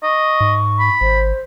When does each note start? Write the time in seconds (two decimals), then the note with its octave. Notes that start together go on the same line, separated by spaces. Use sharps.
0.03 D#5 C#6
0.41 G#2
0.80 B5
1.01 G#1 C5